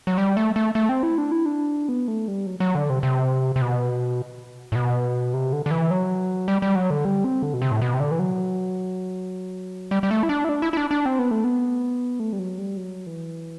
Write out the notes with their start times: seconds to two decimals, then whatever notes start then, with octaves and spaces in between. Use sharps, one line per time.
0.07 F#3
0.18 G3
0.37 A3
0.56 A3
0.75 A3
0.89 C4
1.03 E4
1.18 D4
1.32 E4
1.46 D4
1.88 B3
2.08 A3
2.28 G3
2.46 F#3
2.60 F#3
2.75 D3
2.90 C3
3.03 C3
3.56 C3
3.62 B2
4.72 A2
4.75 B2
5.33 C3
5.52 D3
5.66 D3
5.71 E3
5.90 F#3
6.48 G3
6.62 G3
6.75 F#3
6.90 D3
7.05 G3
7.24 C4
7.42 D3
7.54 B2
7.62 C3
7.71 A2
7.82 B2
7.94 C3
8.00 D3
8.11 E3
8.19 F#3
9.91 G3
10.03 G3
10.11 A3
10.23 E4
10.29 D4
10.44 E4
10.49 D4
10.62 E4
10.73 E4
10.77 D4
10.91 D4
11.06 C4
11.19 B3
11.31 A3
11.44 B3
12.20 A3
12.33 G3
12.39 F#3
12.59 G3
12.77 F#3
13.06 E3